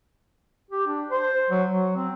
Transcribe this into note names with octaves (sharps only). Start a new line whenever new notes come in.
G4
D4
C5
F#3
F#3
C4